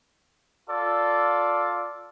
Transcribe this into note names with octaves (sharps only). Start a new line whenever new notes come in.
F4 A4 D5